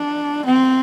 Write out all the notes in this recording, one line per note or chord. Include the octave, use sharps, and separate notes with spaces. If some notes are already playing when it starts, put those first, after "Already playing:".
Already playing: D4
C4